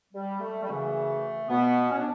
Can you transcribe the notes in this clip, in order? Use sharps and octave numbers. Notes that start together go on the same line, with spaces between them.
G3
A3
G3
F#2 C#3 E3 A3
B2 B3
C#4
D4